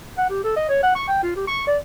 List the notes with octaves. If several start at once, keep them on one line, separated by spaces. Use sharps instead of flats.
F#5
G4
A4
D#5
C#5
F#5
C#6
G5
F4
G4
C#6
D5